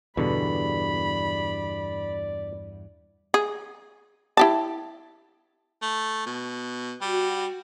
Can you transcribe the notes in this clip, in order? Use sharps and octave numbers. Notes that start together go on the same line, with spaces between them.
E2 G2 B2 D3 D5 A#5 B5
G#4
E4 G4 A5
A3
B2
G3 F#4